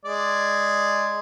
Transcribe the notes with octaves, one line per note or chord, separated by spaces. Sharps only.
G#3 D5